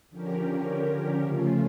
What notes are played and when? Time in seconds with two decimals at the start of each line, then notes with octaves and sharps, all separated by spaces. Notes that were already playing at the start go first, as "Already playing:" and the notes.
0.10 D3 F3 C#4 G4 A#4
1.23 C#3 F3 A3 C#4 F4